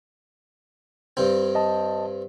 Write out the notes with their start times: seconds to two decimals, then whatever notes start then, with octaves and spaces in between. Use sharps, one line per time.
1.17 G2 C4
1.55 D#5 A5